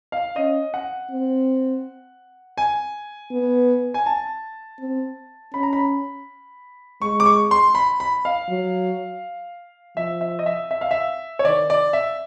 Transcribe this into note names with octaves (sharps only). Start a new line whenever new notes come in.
F5
C#4 D#5
F#5
C4
G#5
B3
G#5
A5
C4
C#4 B5
A#5
B5
G#3 C#6
D6
C#6
C6
B5
B5
F5
F#3
F3 E5
E5
D#5
E5
E5
F5
E5
C#5
D#3 D5
D5
E5